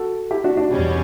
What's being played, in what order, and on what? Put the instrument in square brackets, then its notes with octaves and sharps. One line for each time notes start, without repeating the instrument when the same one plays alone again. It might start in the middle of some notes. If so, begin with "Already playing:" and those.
Already playing: [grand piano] F#4 A4
E4 G4
D4 F#4
D4 F#4
[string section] E2 B2 G3 C#4